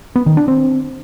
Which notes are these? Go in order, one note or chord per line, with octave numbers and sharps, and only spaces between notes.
B3
D#3
D4
C4